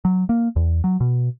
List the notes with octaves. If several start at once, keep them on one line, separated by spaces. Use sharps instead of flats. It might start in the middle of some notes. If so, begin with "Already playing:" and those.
F#3
A#3
E2
F#3
B2